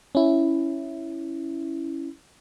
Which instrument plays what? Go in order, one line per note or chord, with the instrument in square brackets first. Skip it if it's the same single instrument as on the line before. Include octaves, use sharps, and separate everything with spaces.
[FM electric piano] C#4 E4